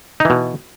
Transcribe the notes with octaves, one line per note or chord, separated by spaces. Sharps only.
B2 E3 D#4